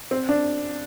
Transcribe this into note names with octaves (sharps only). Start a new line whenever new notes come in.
C4
D4